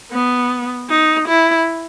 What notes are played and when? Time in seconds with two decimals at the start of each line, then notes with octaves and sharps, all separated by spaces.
0.12 B3
0.90 D#4
1.28 E4